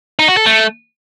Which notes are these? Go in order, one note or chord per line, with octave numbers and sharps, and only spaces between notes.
D#4
F#4
A4
A3